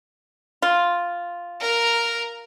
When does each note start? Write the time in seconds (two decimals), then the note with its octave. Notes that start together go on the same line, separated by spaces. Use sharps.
0.62 F4
1.60 A#4 A#5